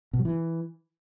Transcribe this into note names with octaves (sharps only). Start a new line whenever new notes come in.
B2
F#3
E3